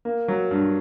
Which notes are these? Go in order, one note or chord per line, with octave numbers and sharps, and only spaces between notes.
A#3
F#3
G2